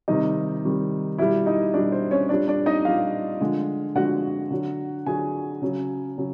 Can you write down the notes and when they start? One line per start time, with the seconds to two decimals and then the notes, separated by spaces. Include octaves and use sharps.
0.08 C3 D#3 G3 D#4 D#5
0.63 C3 D#3 G3
1.18 B2 G3 E4 E5
1.46 D#4 D#5
1.74 B2 G3 D4 D5
1.92 C5
2.11 C#4 C#5
2.29 A#2 G3 D4 D5
2.48 D4 D5
2.66 D#4 D#5
2.85 A#2 G3 F4 F5
3.41 D3 F3 G#3
3.95 D3 F3 G#3 F#4 F#5
4.51 D3 F#3
5.06 D3 F#3 G#4 G#5
5.62 C#3 F#3
6.18 C#3 F#3